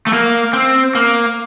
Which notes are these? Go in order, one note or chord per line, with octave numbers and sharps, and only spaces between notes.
A3
A#3
C4
A#3